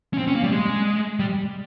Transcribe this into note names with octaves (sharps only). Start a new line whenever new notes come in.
C#4
C4
C#4
A#3
G3
G#3
G3